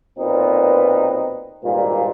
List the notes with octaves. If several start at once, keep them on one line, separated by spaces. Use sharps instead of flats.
B1 A#2 C4 D#4 B4
G#1 G2 A#2